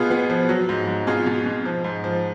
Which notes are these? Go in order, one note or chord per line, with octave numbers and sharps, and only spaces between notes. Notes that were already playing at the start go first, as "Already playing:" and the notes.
Already playing: B2 B3 F4 G#4
B3
F3
F#3
G#2
G#2
B2 F4 G#4
B2
B2
F3
G#2
F3